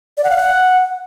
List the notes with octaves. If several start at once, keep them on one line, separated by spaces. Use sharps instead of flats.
D5
F#5
F5
F#5